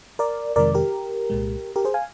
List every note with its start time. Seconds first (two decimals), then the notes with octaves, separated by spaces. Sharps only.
0.19 A#4 D5
0.56 F2 C3 D#3 G#3 A#4 D5
0.75 G4 A#4
1.30 C2 A#2 G#3
1.76 G4 A#4
1.85 G#4 C5
1.94 F5 G#5